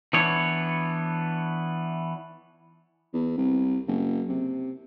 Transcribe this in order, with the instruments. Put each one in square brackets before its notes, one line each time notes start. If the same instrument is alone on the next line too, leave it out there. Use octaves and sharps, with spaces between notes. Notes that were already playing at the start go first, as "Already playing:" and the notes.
[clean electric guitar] E3 B3 D4 C#5
[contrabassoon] E2
C2
F#1
C3